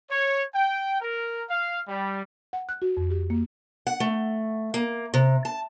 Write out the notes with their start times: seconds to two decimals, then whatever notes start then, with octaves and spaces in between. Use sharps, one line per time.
0.10 C#5
0.55 G5
1.01 A#4
1.50 F5
1.88 G3
2.53 F#5
2.69 F#6
2.82 F#4
2.97 F2
3.10 G4
3.30 A#3
3.87 F#5
4.00 A3
4.74 A#3
5.14 C3
5.45 A5